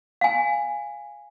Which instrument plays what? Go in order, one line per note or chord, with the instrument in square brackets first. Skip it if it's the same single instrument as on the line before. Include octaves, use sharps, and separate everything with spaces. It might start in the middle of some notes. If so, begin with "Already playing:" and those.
[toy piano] F5 G#5